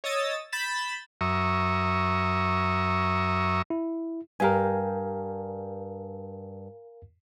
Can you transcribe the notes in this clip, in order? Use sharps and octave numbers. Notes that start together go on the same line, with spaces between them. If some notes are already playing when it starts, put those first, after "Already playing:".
C#5 D#5 D#6 E6 A6
B5 G6 A6 B6 E7
F#2 E5 A#5 C#6 D#6
E4
G2 G4 A#4 F5 G#5